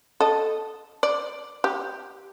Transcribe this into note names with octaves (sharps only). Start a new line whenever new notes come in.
A4 D#5
D5
G4